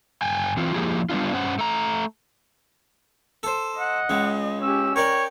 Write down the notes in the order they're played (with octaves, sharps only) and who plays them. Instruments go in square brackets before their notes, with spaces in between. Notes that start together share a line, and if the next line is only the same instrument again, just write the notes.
[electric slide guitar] G2 G5 G#5
E3 C4 F4
F3 A#3 E4 G4 G#4
G3 B3 D4 F4
G2 C#4 C5 F#5
A3 A#5
[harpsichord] A4 C5
[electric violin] D#5 [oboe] F#5
[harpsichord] C#2 G#3
[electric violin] C#4 G4 [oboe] E6
[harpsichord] A#4 D5 [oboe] C#5 [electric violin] G5